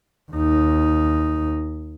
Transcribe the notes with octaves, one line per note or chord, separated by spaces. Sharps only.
D#2 D#4